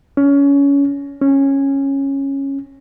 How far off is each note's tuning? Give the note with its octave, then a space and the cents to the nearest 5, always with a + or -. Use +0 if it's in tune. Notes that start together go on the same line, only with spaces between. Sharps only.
C#4 +25
C#4 -10